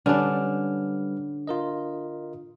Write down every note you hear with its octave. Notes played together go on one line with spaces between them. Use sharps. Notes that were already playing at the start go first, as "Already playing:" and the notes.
D3 G3 C#4 D4 B4 F6
F4 A#4 D#5